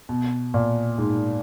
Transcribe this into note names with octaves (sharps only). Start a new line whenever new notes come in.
B2
A#2
G#2